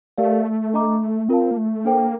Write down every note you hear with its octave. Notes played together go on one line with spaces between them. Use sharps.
A3 G4 A#4 D5 F5
D4 A4 D#5 A#5 D6
C4 F4 A#4 F5 A5
A#3
A3
A#3 D4 A4 C5 G5